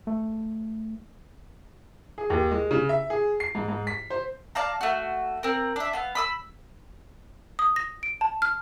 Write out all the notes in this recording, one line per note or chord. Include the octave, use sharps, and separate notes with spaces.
A3
G#4
D#2
G#3
C#3
E5
G#4
C7
G#2
G#2
B6
C5
D5 F5 A5 A#5
A3 F#4
C4 A#4
D4 E5
B3 F5
B5 D#6 E6
D#6
A#6
D7
A5
F6